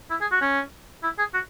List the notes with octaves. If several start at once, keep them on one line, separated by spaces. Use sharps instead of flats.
E4
G#4
F#4
C#4
E4
G#4
F#4